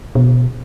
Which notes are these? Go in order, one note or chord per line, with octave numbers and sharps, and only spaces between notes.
B2